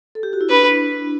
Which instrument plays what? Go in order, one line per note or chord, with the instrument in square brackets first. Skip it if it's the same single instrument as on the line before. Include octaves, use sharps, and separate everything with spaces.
[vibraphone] A4
G4
F#4
E4
[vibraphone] D4 [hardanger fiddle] B4